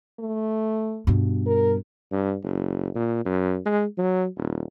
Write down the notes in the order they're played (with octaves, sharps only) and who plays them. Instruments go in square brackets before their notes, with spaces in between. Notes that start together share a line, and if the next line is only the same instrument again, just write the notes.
[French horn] A3
[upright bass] G2 B2
[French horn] A#4
[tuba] G2
F#1
A#2
F#2
G#3
F#3
D#1